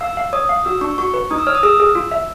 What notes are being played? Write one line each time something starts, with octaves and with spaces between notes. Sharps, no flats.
F5 E6
F5
C#5 D#6
F5
F#4 E6
D4 C#6
F#4 C#6
B4
D#4 D#6
E6
C#5 F6
D#6
G#4 E6
G#4
F4
E5